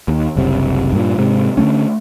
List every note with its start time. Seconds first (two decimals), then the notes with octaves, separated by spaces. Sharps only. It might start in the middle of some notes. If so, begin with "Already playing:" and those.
0.08 D#2
0.36 F#1 C2 C3
0.93 G2 A#2
1.18 G#2 C3
1.57 D3 F#3 A3 C#4